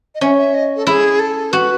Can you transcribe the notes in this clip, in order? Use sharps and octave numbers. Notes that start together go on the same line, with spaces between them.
D#5
C#4 E5
E5
D#5
A4
E4 G#4
A4
F#4 B4